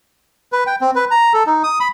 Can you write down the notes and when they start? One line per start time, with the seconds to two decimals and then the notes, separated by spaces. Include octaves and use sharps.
0.52 B4
0.67 G5
0.81 C4
0.95 B4
1.11 A#5
1.34 A4
1.47 D#4
1.63 D#6
1.80 B5